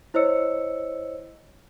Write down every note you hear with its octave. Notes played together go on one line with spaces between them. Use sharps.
E4 C5 C#5 D#5 E6 C#7